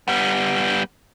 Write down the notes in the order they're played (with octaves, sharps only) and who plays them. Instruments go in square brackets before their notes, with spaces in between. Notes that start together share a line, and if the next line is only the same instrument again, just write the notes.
[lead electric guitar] G3 B3